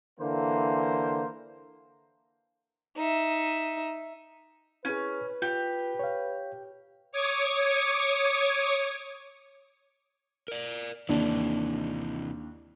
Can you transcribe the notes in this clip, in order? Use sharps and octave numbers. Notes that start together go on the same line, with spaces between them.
D3 E3 A#3 C5
D#4 E5
C#4 E4 G#4 B4
F4 G4
C#5 F5
C#5 D6 D#6 G#6 C#7
A#4 D5
D#2 C3 E3 D4